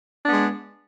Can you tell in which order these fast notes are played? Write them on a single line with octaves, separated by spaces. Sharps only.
D4 B3 G#3